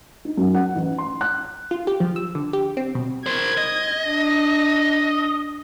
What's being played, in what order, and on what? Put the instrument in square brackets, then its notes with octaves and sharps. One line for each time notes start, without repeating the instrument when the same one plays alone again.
[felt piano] D#4
F#2
F#5
A1
C6
F#6
[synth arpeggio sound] F4
G4
F3
E6
D3
G4
C4
B2
[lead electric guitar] A#4 C5 [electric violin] G#6
[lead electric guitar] D#5
[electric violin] D4 A#6